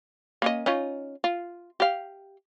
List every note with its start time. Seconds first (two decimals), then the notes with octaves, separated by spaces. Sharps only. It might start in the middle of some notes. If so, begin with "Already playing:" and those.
0.42 A#3 C#4 D#5
0.66 C#4 D#4 F4
1.24 F4
1.80 G4 F5